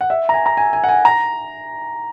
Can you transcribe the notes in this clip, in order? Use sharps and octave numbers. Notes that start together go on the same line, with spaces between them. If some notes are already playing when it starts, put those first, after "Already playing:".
F#5
E5
A#5
G#5
A#5
G#5
G#5
F#5
G#5
A#5